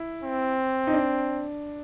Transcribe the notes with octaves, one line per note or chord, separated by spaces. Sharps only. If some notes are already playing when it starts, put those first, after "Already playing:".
Already playing: E4
C4
D#4
D4